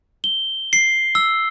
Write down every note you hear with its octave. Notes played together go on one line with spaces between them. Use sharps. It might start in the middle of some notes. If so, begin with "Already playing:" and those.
G7
C7
E6